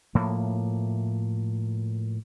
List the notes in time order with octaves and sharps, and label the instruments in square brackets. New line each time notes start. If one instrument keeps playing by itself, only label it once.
[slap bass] A2 F3 A#3